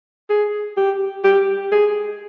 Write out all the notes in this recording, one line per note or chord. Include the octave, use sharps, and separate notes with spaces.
G#4
G4
G4
G#4